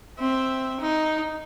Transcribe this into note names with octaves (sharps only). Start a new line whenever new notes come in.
C4 E5
D#4